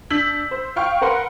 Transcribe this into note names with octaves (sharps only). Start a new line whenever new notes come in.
D4 E6 G6 B6 F#7
C5
F5 G5 C#6 F6
A#4 B4 F#5 C6